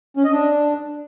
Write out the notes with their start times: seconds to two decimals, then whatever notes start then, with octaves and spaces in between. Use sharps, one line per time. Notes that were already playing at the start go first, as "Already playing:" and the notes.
0.17 C#4
0.25 D#5
0.33 D4